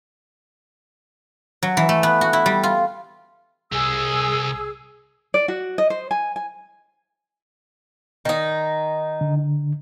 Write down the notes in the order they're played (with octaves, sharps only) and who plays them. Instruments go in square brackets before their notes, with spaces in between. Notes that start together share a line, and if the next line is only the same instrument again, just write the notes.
[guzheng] F#3
E3
A3
B3
F#4
E4
G3
F4
[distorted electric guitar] C2 [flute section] G#4 E6
[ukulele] D5
F#4
D#5
C5
G#5
G#5
[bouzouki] D#3 D#4
[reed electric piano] D3